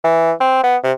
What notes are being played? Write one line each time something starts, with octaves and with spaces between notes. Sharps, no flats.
E3
C4
B3
C3